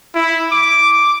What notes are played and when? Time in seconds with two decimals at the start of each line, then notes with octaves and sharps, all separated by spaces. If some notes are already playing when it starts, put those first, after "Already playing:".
0.15 E4
0.52 D6